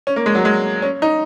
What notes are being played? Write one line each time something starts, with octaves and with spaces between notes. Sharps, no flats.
C#4
A#3
G#3
F#3
G#3
C#4
D#4